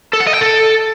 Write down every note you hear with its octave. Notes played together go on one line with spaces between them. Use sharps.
A4
F#5
D#5
G5
A4